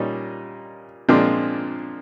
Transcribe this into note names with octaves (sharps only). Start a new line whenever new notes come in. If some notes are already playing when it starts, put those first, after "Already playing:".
Already playing: A#2 G3 C#4 D#4
A#2 F3 G#3 C4 D4